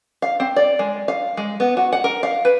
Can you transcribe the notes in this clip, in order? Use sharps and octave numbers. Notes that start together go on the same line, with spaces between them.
F5
C4
D5
G#3
F5
G#3
B3
F#4
F#5
A#4
F5
B4